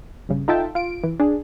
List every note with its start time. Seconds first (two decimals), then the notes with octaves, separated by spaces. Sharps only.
0.29 A#1 G2 C#3
0.48 D#4 F4 A4 E5 G5 A5
0.75 F4 D7
1.03 E3
1.20 D4 G#4